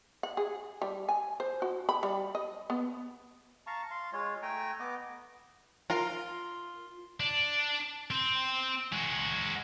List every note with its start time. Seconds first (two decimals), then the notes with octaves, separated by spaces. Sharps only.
0.23 F#5
0.37 G#4
0.82 G3
1.09 G#5
1.40 C5
1.62 F#4
1.89 B5
2.03 G3
2.35 D#5
2.70 B3
3.67 F5 A5 A#5 C#6
3.91 F5 C6
4.13 G#3 F4 C#5
4.42 A3 G5 G#5 A#5
4.80 B3 D#5 D6
5.90 F4 A#4 A#5
7.20 D4
8.11 C4
8.92 G#3 F#4